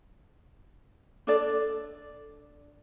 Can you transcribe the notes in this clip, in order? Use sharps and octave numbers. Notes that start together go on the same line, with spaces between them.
D4 A4 D5